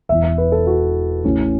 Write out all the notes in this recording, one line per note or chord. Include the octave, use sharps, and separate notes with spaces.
E1 E2 E3 E5
E5
B4
A4
F#4
A1 A2 E3 C#4